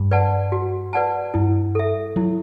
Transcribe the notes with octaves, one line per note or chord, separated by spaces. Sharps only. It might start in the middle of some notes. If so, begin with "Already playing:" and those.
Already playing: G2
B4 D5 F#5 A5
F#4
B4 D5 F#5 A5
G2 E4
A4 E5
F#3 E4